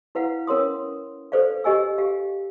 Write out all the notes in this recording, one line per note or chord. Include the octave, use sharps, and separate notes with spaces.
E4 B4 F5 F#5
C#4 A#4 C#5 C6 D#6
A4 B4 C5 D5 F5
G4 D#5 G#5 E6
G4 F5